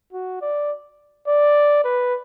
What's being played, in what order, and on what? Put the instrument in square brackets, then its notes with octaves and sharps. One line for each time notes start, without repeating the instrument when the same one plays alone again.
[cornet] F#4
D5
D5
B4